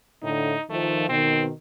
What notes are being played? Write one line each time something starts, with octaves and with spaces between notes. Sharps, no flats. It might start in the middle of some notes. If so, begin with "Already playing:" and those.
A2 D3 D#4
D#3 F3 A3
B2 D#3 C4